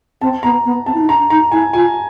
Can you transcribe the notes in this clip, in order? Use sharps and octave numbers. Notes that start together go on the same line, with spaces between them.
C4 A5
B3 A#5
B3
C4 A5
E4
D#4
D4 A#5
D#4 A#5
E4 G#5
F4 G#5